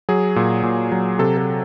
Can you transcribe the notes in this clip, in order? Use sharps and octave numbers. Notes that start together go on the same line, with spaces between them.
F#3 G#4
A#2
A#2
F#3
C3 A4
A4